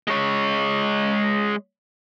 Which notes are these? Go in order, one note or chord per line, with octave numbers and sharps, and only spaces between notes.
G#3 C#5